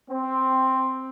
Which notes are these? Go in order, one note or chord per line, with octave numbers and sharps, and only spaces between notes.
C4